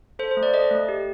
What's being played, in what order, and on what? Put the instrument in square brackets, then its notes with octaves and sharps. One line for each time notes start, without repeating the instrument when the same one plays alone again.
[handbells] A4 C5
C5
A3
D5
A4 D#5
A3
G4